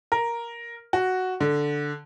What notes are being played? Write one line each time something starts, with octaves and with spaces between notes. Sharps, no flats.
A#4
F#4
D3